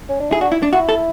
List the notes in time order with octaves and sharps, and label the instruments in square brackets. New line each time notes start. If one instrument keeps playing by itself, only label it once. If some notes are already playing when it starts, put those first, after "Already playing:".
[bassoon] C#4
D4
[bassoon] E4 [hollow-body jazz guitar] G#4
[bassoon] D4 [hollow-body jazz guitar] F#4
[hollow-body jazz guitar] E4
D4
[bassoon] E4 [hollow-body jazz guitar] F#4
[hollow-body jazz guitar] A4